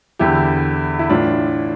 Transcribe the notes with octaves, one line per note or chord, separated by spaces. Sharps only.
E2 D3 E4 G4
E4
A2 E3 D4 F4